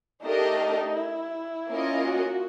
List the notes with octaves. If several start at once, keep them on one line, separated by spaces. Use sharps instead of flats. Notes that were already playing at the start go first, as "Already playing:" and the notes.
A3 D4 D#4 G4 A#4 D#5
E4
A#3 C#4 F4 A#4 D#5
F#4